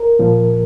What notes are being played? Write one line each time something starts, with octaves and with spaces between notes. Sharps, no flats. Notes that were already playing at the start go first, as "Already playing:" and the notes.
Already playing: A#4
A#2 F3